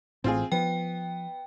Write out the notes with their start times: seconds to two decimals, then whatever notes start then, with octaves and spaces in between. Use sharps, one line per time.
0.24 A1 A2 C4 F4 G#4
0.52 F3 B3 G5